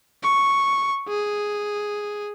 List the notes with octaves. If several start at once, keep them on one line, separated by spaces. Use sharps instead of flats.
C#6
G#4